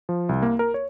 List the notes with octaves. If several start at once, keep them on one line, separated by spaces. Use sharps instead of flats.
F3
C2
A#3
A#4
C#5